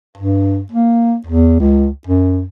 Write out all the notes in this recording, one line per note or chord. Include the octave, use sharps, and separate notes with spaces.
G2
A#3
E2
C#2
F#2